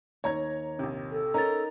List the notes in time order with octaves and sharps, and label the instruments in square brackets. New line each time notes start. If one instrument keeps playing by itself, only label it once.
[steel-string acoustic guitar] D#2 [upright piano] C#5 A#5 G#6
[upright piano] A#1 C3
[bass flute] A4
[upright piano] C#4 [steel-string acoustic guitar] D#4 A#4 [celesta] A#5 A6